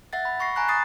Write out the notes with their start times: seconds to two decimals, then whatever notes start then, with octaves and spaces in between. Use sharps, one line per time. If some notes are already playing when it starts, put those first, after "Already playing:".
0.13 E5 F#5 A6
0.25 B5
0.40 B5 C#6 A#6 C7
0.56 G#5 A#5 B5 F#6
0.68 D#6 A6 C7